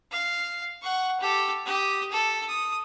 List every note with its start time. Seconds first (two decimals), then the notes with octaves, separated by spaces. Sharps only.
0.11 F5
0.82 F#5 C#6
1.20 G4 A4
1.66 G4 D#6
2.12 A4
2.48 D#6